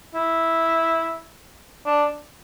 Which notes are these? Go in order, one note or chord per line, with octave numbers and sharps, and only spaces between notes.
E4
D4